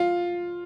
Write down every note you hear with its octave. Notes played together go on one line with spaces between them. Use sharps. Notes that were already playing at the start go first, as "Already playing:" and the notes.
Already playing: F4